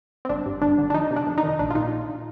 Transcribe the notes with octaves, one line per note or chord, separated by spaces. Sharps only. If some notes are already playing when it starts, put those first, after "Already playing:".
C4
G1 D4
G2
G1 D4
D3
D4
F2 D#4
C3
D4
F2
D#4
D#3
A#1 D4
F4
A#2 D#4